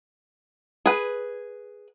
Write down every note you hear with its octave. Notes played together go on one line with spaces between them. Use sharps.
G#4 B4